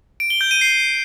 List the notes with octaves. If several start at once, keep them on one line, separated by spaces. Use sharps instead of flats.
D7
G7
G6
D#7
C7